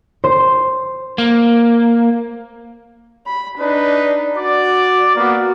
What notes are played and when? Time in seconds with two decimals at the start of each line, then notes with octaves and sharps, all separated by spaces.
0.24 C5
1.18 A#3
3.27 B5
3.58 D4 D#4 B4
4.35 F#4 D5
5.16 A#3 B3 F#4